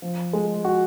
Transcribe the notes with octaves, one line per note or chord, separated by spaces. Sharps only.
F3
G#3
F#4